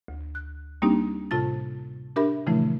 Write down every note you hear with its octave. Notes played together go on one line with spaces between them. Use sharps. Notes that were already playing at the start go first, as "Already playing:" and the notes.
D2
F#6
G3 A#3 C4 D4 D#4 G4
A2 C3 F4 A5 A6
D4 G4 A#4 E5 B5
A#2 C#3 E3 F3 A3 E4